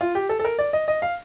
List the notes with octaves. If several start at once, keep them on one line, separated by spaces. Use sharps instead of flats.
F4
G4
A4
A4
A#4
D5
D#5
D#5
F5